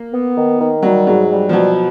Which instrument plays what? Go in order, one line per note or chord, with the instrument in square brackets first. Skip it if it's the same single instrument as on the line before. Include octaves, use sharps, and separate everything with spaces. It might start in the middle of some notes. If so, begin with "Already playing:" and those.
Already playing: [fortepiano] A#3
[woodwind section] B3
D#3
D#3
[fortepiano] F#3 [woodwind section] G3
[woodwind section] G#2 [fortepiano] F#3
[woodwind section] G3
[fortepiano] F3
[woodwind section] B2 [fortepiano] F#3